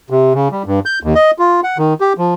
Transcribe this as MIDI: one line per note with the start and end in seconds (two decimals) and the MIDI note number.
0.10 0.33 48
0.34 0.48 49
0.52 0.62 55
0.66 0.80 43
0.86 0.99 91
1.03 1.14 39
1.15 1.31 75
1.39 1.60 65
1.64 1.78 78
1.78 1.94 51
2.01 2.13 67
2.18 2.34 53